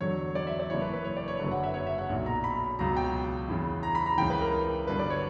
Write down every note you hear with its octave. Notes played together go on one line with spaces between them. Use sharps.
E2 D3 F#3 C#5
D5
E5
D5
F#1 F#2 E3 C#5
B4
B4
C#5
D5
C#5
F#1 F#2 D3 F#3 B4
F#5
E5
C#5
E5
F#5
B1 A#2 F#3
A#5
B5
C#2 B2 F#3 A#5
G5
E2 C#3 E3
A#5
B5
A#5
C#2 C#3 E3 G5
B4
A#4
G1 G2 D3 F#3 B4
D5
C#5